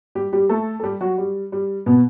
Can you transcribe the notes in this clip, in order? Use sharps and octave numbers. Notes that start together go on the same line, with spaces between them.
G3 G4
G3 G4
A3 A4
A4
G3 G4
F#3 F#4
G3
G3
B2 B3